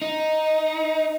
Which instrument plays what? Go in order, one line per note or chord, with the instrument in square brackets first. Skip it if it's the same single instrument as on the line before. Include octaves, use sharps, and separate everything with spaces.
[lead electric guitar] D#4